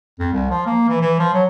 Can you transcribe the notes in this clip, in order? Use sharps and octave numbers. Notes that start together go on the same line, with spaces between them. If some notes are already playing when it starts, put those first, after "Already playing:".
F2
C2
F3
A#3
E3
E3
F3
F#3